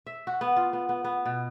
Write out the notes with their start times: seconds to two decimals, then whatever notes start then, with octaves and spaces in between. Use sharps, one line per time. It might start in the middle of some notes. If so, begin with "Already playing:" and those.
0.07 E5
0.27 F#4
0.41 B3
0.56 F4
0.73 B3
0.89 B3
1.04 B3
1.26 B2